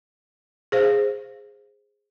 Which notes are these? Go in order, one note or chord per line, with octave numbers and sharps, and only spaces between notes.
G#4 C5 F5